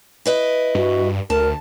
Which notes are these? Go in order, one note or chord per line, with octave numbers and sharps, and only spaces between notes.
E4 B4 D#5
G2 F#4
D2 A#4 A5